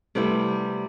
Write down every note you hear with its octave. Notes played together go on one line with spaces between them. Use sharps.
C3 G3 A3 B3 E4